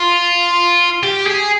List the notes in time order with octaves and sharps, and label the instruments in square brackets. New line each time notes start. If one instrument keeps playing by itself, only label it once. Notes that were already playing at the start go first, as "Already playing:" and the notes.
Already playing: [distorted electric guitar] F4
G4
G#4